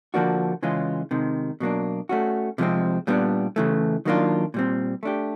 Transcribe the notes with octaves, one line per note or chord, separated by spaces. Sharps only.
D3 F3 A#3 D4 F#4
C#3 E3 G#3 C#4 F4
C3 D#3 G#3
B2 F#3 A#3 D4
A3 C#4 F#4
C3 F3 G#3 C4
A#2 G3 B3 D4
C#3 E3 A3
D#3 F#3 A#3 D4 F4
A#2 G3 C4
A3 D4 G4